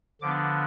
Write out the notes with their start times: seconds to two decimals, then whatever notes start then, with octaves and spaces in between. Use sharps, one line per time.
0.21 D3 F3 B3 D4 D6